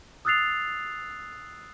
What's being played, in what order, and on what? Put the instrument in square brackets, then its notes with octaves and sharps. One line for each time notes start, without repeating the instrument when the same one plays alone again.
[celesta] D#6 E6 F#6 A6 C7 F7